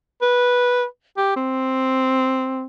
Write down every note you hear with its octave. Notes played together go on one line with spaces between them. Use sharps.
B4
G4
C4